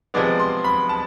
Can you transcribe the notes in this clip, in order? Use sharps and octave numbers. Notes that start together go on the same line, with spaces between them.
C3 F3 G#3 B3 D5
C6
B5
A5